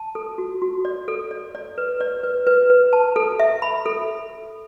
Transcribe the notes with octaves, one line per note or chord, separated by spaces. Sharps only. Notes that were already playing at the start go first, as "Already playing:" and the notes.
Already playing: A5
A4
F#4
F#4
D5
A4
D5
D5
B4
D5
B4
B4
B4
A5
A4
E5
B5
A4